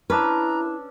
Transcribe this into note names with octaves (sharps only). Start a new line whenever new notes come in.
C#4 D4 E4 B4 A#5 E6